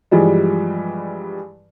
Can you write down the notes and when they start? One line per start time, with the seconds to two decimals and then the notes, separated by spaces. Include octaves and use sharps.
0.11 G2 E3 F3 G3 G#3